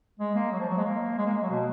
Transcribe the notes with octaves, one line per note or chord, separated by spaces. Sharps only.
G#3
A#3
F#3
F3
F#3
G#3
A#3
G#3
A#3
G#3
F#3
B2